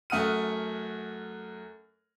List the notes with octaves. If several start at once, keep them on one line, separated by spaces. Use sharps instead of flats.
F#2 A3 F#5 D#6 F6 D#7